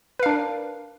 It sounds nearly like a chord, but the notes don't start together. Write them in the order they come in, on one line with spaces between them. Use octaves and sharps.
B4 F5 D4 A#4